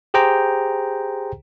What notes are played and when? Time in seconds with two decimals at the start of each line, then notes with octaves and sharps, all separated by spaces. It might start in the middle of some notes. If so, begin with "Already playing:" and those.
0.14 G4 G#4 C5 G5 A#5